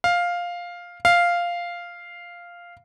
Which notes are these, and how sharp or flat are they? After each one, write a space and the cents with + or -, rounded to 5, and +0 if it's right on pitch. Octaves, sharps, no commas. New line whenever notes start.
F5 +5
F5 -5